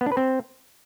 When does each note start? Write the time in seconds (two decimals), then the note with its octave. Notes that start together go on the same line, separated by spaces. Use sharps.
0.01 B3
0.06 D4
0.12 B4
0.17 C4